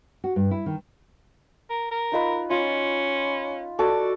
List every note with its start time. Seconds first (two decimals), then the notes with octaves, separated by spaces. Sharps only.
0.24 F#4
0.36 G2
0.51 E4
0.66 D#3
1.70 A#4
1.91 A#4
2.12 D#4 F4 B4
2.50 C#4 F4
3.79 F#4 A4 D5